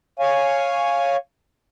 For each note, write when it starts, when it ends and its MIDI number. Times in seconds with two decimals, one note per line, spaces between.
0.19 1.16 73
0.19 1.16 77
0.19 1.16 80